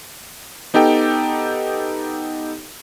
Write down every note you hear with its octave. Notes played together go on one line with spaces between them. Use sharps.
B3 D#4 G4 A4 G5